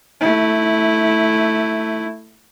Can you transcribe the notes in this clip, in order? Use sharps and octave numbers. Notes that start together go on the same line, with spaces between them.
A3 E4